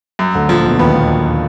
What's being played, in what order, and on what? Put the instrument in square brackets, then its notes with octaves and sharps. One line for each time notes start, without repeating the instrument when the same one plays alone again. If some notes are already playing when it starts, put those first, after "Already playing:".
[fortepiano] F#2
[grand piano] D2 D3
[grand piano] A#2 [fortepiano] F3
[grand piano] B1 B2
[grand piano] D#2 D#3 [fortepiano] B3
[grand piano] A#2 A#3